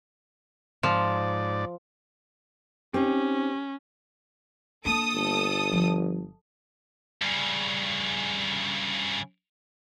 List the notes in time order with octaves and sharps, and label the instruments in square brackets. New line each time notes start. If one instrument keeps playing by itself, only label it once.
[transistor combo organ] G#2 D5 [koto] F3
[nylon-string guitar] C4 D#4 [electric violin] C#4 [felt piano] G4
[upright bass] A#3 D4 [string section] A4 D#6
[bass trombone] G1
[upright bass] F3
[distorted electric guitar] G2 C#3